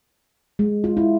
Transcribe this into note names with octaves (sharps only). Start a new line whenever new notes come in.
G#3
F4
E4